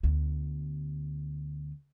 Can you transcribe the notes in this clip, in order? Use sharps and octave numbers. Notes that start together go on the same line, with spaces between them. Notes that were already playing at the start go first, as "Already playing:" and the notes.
D2 B3